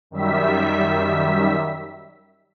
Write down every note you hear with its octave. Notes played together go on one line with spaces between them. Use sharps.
F#2 D#3 G3 E5 B6